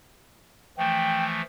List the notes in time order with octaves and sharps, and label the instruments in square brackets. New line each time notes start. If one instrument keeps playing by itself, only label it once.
[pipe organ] E3 F3 A3 [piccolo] G5